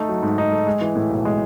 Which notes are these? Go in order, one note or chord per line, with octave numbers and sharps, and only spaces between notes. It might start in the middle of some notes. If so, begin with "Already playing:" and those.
Already playing: A3 D#4
F#3
G#2
D#4
A3
G#3
E3
A2
B1
G#3